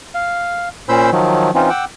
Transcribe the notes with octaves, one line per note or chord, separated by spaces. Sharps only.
F5
A#2 C#4 C5 B5 E6 G6
D#3 F3 F#3
E3 C4 C#4 D#4 F4
F#5 G5 D6 E6